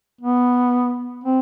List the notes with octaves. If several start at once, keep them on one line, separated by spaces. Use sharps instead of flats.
B3
C4